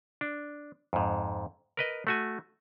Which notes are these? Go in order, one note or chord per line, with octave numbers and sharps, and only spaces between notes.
D4
F2 G#2
A#4 B4 D#5
A3 F#4 G#5